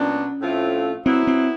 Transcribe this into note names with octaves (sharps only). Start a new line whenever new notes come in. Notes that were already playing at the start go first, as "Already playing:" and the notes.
Already playing: A#2 F#3 B3 C#4 D4
A2 F3 A3 C4 F4
F#3 B3 C4 E4
C4